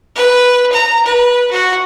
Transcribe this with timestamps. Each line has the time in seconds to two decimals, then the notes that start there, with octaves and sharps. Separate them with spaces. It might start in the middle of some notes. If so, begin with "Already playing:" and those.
0.16 B4
0.72 A#5
1.06 B4
1.51 F#4